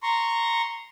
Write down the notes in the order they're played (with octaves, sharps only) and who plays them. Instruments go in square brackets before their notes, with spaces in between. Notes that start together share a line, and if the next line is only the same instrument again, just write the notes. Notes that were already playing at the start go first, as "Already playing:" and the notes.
[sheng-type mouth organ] A#5 C6 C#6